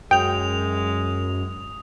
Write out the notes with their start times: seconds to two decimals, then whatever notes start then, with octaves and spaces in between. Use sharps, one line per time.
0.11 F#2 G#3 G5 D#6 F7